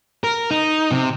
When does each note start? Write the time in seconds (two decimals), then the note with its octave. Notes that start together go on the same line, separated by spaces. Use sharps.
0.24 A#4
0.51 D#4
0.91 C3